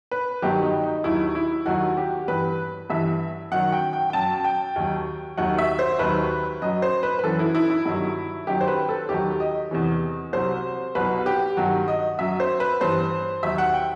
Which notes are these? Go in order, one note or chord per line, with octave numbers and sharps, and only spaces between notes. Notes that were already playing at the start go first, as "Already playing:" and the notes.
B4
G2 D#3 F#3 G4
D#4
D#4
D#2 D#3 F#3 E4
E4
D#2 D#3 F#3 F#4
G4
G2 E3 B4
G2 E3 E5
F#2 D#3 F#3 F#5
G5
G5
G5
F#2 F#3 A5
G5
D#2 D#3 F#3
D#2 D#3 F#3 F#5
E5
C5
D#2 D#3 F#3 B4
F#2 F#3 D#5
C5
B4
B4
F#2 E3 A4
E4
E4
E4
G2 D#3 F#3
F#2 D#3 F#3 G4
C5
B4
A4
D#2 D#3 F#3 G4
D#5
E2 C3 E3
C2 C3 F#3 C5
C2 B2 F#3 B4
G4
G2 D#3 F#3 F#4
D#5
F#2 F#3 E5
C5
B4
G2 E3 C5
D#2 D#3 F#3 E5
F#5
G5